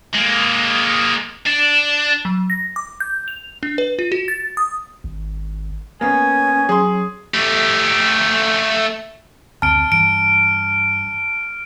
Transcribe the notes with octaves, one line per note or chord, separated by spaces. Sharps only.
G#3 A#3
D4
F#3
A#6
D6
G6
F7
D4
B4
F4
F#4
A6
D#6
G#1
A#3 B3 C#4 G#5
F#3 G#4 C6
A3 G4
F#1 D2 C4 A5 F6 D7
G2 E3 D7